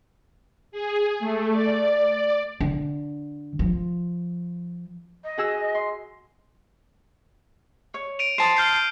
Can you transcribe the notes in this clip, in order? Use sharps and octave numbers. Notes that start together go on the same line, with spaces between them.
G#4
A3
D5
D3
F3
D#5
F#4 G#4 E6
C6
C#5
D7 D#7 F7
C5 A5 D#6
F6 G6 C7